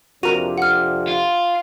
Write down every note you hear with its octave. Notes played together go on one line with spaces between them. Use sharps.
F2 C3 D4 F#4 A#4 D#7 F7
F#5 F6
F4